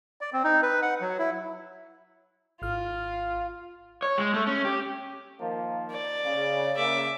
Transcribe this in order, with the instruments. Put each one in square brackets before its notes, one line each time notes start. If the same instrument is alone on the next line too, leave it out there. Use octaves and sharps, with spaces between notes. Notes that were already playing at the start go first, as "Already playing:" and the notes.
[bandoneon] D5
C4
D#4
B4
F#5
F#3
E4
[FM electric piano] G#1 F6 [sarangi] F4
[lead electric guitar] C#5
G#3
A3
C#4
G4
[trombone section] D#3 F3 A#3
[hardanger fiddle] D5
[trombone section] C#3
[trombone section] C#3 A#3 [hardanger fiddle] E5 D6